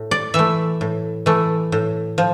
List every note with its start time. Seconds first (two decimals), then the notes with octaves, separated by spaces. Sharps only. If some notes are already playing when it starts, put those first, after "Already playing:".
Already playing: A2
0.11 D5
0.34 E3 A3 E5
0.81 A2
1.26 E3 A3
1.72 A2
2.18 F3